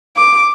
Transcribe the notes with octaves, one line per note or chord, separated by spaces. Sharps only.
D6